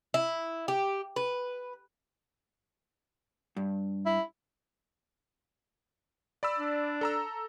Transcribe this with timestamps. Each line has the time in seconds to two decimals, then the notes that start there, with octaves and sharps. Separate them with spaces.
0.14 E4
0.68 G4
1.16 B4
3.56 G2
4.06 E4
6.43 D5 B5 E6
6.58 D4
7.01 A4 A#5 E6